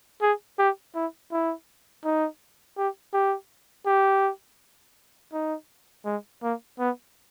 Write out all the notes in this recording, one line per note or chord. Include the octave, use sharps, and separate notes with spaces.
G#4
G4
E4
E4
D#4
G4
G4
G4
D#4
G#3
A#3
B3